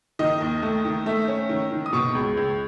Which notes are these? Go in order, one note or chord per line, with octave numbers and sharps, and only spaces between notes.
D#3 D#5
D#2
A3
D#3
A3 E5
C#4
D#3
D#3
D#6
B2 C#6
C#2
C#2